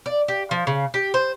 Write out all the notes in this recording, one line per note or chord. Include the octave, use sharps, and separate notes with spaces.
D5
G4
F3
C#3
G4
C5